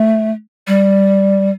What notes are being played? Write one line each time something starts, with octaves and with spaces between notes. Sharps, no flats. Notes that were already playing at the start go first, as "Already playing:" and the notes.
Already playing: A3
G3